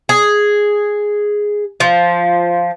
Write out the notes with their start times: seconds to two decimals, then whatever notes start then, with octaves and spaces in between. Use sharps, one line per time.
0.09 G#4
1.80 F3